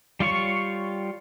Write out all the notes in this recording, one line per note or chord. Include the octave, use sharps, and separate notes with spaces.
G3 F4 C#5 C#6